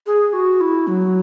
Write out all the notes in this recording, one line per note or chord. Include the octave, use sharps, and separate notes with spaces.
G#4
F#4
E4
F#3